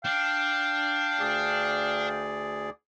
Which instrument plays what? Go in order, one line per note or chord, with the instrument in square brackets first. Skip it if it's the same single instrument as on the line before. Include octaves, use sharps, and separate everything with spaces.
[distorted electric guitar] D4 [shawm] F5 [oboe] G5
[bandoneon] D2 G#4 D5